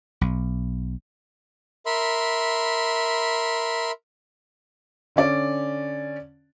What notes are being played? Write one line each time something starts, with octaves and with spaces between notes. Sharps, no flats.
B1
A#4 E5 B5 C6
D3 C#4 D5